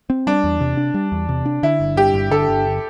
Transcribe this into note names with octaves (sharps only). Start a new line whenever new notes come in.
C4
G3 D4
E2
C3
D4
G3
E2
C3
D4
D3 E4
G1
G2 G4
G1
D3 A4
G1